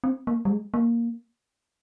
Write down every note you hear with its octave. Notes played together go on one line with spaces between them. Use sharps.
C4
A#3
G3
G#3
A#3